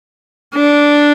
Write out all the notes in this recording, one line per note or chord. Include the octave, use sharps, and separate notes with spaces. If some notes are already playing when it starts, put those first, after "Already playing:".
D4